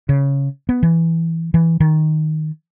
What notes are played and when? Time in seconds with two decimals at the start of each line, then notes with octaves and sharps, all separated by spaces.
0.09 C#3
0.69 B3
0.83 E3
1.54 E3
1.80 D#3